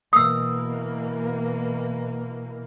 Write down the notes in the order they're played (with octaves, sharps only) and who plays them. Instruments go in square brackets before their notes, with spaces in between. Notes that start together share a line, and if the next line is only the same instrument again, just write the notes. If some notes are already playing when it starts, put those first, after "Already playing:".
[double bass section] B2 E3 A#3 [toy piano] D#6 E6